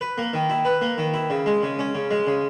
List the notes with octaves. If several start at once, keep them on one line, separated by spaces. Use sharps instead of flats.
B4
A#3
D#3
E4
B4
A#3
D#3
E4
C#3
G#3
C#3
C#4
C#3
G#3
C#3